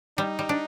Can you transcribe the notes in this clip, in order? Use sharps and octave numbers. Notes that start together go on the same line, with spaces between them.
G3 D#4
G3
D4